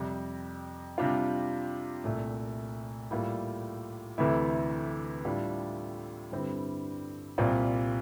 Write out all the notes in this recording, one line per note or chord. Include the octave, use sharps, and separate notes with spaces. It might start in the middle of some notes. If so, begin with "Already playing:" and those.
Already playing: F2 C3 G3
C3 G3 D4 F4
C2 A#2 A3
A2 G3 A#3 F4
D2 C3 E3 A3 E4
A2 G3 D4 F4
G2 D3 G3 C4 E4
C2 A#2 G3 C4 F4